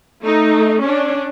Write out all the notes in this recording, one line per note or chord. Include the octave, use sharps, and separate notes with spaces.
A3 D#4
C#4 D4